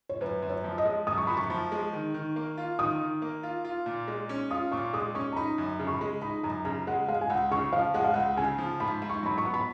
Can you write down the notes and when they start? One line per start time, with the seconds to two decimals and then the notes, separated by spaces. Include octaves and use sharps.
0.09 C#5
0.21 F#2 B4
0.42 F#2
0.49 C#5
0.64 F3
0.78 D#5
0.85 G#3
1.07 F#2 D#6
1.18 C#6
1.27 F#2 B5
1.37 C#6
1.50 F3
1.72 G#3
1.93 D#3
2.14 D#3
2.36 A#3
2.58 F4
2.79 D#3 D#6
3.01 D#3
3.22 A#3
3.43 F4
3.65 F4
3.86 A#2
4.08 G#3
4.29 C#4
4.50 F4 D#6
4.72 A#2 C#6
4.93 G#3 D#6
5.15 C#4 C#6
5.33 A#5
5.36 D#4 B5
5.58 F#2
5.79 C#3
5.87 C#6
5.94 B5
6.01 G#3
6.22 D#4 B5
6.44 F#2 A#5
6.65 C#3 A#5
6.87 G#3 F#5
7.08 G#3 F5
7.21 G#5
7.30 C#2 F#5
7.51 C#3 C#6
7.72 F3 F5
7.94 G#3 F#5
8.04 F5
8.14 C#2 F#5
8.37 C#3 G#5
8.58 F3
8.80 G#2 B5
9.02 G#2
9.09 C#6
9.23 F#3 B5
9.38 C#6
9.45 B3
9.54 B5